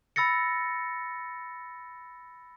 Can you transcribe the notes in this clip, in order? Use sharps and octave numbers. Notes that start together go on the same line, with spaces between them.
B5 E6 A6 A#6 C#7